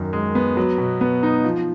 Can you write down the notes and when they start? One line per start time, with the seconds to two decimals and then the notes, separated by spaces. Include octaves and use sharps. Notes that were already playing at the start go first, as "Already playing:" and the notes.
Already playing: F#2 D#3
0.13 G#3
0.35 B3
0.57 F#3
0.78 B2
1.01 B3
1.23 D#4
1.44 F3